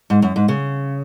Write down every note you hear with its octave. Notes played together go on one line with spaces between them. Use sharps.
G#2
F#2
G#2
C#3